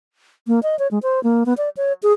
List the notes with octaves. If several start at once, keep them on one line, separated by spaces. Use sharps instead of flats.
A#3
D#5
C#5
G#3
C5
A#3
B3
D5
C#5
G#4